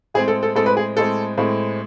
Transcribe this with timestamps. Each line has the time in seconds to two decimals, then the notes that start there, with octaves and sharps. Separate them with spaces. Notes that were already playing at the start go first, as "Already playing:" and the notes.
0.14 A2 G#3 C4 G#4
0.28 A4
0.43 A4
0.55 A2 G#3 C4 A4
0.66 B4
0.77 G#4
0.97 A2 G#3 C4 A4
1.38 A2 G#3 C4